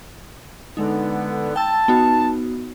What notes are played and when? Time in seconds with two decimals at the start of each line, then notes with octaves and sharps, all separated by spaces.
0.77 D3 G#3 B3 D#4
1.56 G5 A5 E6
1.88 B3 D#4 F#4